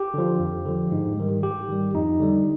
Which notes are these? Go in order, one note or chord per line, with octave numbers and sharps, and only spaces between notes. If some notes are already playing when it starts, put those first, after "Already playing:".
Already playing: G4
D3 F3
F2
D3 F3
G#2
D#3 G3
G#2 G4
D#3 G3
F2 D#4
D3 G3